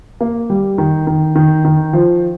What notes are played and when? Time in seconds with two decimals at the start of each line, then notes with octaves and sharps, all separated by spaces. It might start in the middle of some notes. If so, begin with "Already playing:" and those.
0.21 A#3
0.50 G3
0.78 D#3
1.07 D#3
1.36 D#3
1.65 D#3
1.93 F3